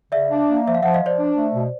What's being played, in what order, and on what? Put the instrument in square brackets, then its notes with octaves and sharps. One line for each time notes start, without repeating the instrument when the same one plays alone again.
[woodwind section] C#3 [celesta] D5 E5
[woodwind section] D4
A#3
[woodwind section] F3 [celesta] E5
[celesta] F5
[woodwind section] F3 [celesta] E5 F#5
[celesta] D#5 F5
[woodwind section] F3
[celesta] C5 D5
[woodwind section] D4
A3
B2